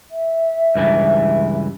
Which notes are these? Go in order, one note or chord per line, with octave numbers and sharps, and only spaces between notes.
E5
C#2 G2 E3